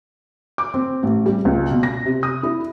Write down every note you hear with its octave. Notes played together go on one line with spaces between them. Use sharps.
D6
C4
A1
G3
C#2
B2
A#6
C3
D#6
E4